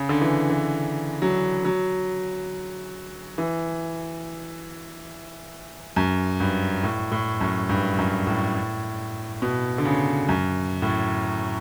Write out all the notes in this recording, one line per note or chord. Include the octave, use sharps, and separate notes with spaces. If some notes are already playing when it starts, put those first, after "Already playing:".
Already playing: C#3
D3
E3
E3
F#3
F#3
E3
F#2
G2
A2
A2
F#2
G2
F#2
A2
B2
D3
C#3
F#2
A2